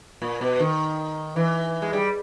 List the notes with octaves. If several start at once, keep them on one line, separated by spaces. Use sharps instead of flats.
A#2
B2
D#3
E3
G#3
G3